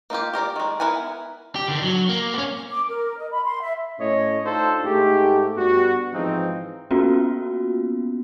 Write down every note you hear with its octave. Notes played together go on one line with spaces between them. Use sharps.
A#3 D#4 F4 G4
G4 A#4 C5 D5
D#3 G#3
B3 E4 A#4 F#5 G#5
G4
D3 D#3
F#3
A#3
B3 C#4
D6
A#4
D#5
B5
C6
E5
A2 A3 C#4 C#5 D#5
D4 D#4 F4 A4 C5
G#2 A3 G4
G2 G3 B3 F#4
G#2 E3 F3 C4 D#4
A#3 B3 C#4 F4 F#4